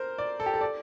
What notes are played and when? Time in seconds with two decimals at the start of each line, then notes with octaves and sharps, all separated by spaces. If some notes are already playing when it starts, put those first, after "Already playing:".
Already playing: A#4 C5
0.18 D5
0.40 A4
0.46 G4
0.54 A4
0.61 D5